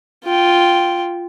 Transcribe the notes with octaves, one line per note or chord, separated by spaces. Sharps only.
F4 G5